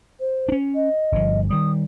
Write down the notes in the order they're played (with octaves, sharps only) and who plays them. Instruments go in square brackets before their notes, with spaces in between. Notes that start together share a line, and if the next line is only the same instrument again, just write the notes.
[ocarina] C5
[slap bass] C#4 D4
[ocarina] D#5
[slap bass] G1 G2 F3
[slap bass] D#3 G3 [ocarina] D#6